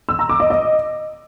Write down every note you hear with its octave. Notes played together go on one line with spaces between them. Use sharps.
E6
A#5
D6
D#5
D#5